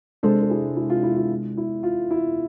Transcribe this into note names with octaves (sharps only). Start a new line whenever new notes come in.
C3 G#3 D4 A4 C5
A4
E4 G#4
E4
F4
E4
F4
E4
F4
E4